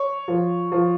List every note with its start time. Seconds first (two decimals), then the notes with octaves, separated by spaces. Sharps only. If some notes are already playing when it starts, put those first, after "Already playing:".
Already playing: C#5
0.28 F3
0.72 F3